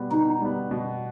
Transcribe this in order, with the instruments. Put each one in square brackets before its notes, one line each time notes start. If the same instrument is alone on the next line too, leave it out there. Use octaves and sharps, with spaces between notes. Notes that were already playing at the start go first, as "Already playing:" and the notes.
Already playing: [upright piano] B2 G3 B3
[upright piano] B2 [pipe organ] D#4
[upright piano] G3 B3
B2